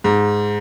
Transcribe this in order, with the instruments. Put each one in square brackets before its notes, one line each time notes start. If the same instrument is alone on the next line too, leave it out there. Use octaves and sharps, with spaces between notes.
[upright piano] G#2